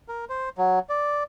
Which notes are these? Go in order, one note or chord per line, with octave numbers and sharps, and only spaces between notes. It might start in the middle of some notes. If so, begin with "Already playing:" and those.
A#4
C5
F#3
D5